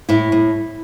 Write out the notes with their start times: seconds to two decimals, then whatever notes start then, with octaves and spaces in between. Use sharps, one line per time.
0.09 A2 E4
0.32 A2